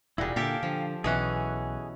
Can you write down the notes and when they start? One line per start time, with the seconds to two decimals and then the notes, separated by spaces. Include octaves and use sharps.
0.18 E1 A#2 G3 E4 F#4 G#4
0.36 A#2 D3 G4 A4 E5 F5 G5 G#5
0.63 D3 F3
1.04 B1 B2 E3 C#4 G#4 G#5 F#6